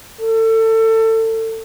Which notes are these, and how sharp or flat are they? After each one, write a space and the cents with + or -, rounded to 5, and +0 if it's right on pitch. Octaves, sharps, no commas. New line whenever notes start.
A4 +25